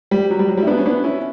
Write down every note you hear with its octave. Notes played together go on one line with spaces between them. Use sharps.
G3
F#3
G3
F#3
G3
E4
B3 D4
C#4
B3 D4
C#4 E4